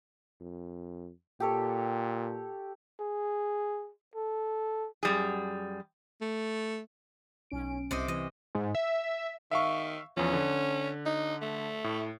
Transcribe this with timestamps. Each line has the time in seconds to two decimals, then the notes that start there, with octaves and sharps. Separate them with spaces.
0.41 F2
1.40 A#2 G4 A4 C#5
3.00 G#4
4.16 A4
5.03 F#2 G3 G#4
6.21 A3
7.51 B1 C#4 D7
7.91 C2 C3 C5 D#5 D6
8.08 E3 D#5
8.55 G#2
8.75 E5
9.51 D#3 E5 F5 C#6
10.17 E2 F3 C#4
10.33 D3
11.06 D#4
11.41 A3
11.84 A2